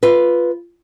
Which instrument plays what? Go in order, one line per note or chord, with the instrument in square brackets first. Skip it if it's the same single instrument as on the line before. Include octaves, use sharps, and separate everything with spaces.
[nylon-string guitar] F4 B4